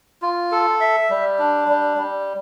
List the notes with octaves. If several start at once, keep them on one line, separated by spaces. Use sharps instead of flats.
F4
A4
E5
G3
D4
G3
G3